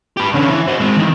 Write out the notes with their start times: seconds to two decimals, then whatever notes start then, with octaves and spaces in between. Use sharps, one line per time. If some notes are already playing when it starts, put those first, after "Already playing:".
0.17 G4 B4
0.34 D3 C#4
0.50 E3
0.67 C4 F#4
0.81 G#3 C4
0.97 D#3 E3